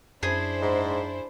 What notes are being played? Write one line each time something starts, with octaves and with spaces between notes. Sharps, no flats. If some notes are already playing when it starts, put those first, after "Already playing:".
F#2 D4 E4 G#4 C5
G#2